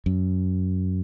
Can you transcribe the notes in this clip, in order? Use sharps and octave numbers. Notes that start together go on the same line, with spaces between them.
F#2